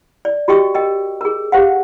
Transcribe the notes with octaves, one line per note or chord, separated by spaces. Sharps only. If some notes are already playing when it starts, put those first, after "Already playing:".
D5
F#4 G4 D#5 G5 C#6 D#6
A#4 D#5 G5
G#4 A#4
G4 C5 F5 F#5